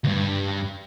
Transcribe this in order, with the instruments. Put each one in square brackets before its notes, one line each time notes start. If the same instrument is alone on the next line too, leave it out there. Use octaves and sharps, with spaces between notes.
[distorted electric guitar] D2 G2